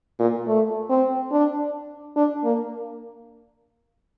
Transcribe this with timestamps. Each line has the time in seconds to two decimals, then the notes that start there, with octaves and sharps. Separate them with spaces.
0.19 A#2
0.47 A3
0.90 C4
1.32 D4
2.16 D4
2.44 A#3